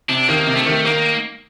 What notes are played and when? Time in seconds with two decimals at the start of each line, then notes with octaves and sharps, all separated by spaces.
0.09 C3 D4
0.28 D#3 A#3
0.47 C3
0.56 A3
0.66 D#3
0.85 D#3 A#3